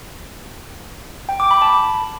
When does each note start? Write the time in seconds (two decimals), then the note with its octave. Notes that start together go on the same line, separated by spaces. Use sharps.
1.29 G5
1.40 D6
1.51 B5
1.62 A5